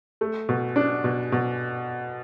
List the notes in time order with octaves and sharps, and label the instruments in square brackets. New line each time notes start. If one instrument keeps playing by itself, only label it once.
[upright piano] A3
B2
D4
B2
B2